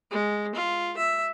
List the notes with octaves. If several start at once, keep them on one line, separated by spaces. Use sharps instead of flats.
G#3
F4
E5